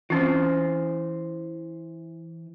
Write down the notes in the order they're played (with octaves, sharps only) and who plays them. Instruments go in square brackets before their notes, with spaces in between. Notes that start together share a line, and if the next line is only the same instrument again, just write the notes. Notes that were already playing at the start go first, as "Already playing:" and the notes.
[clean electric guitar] E3 C5 [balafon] C4 C#4 F4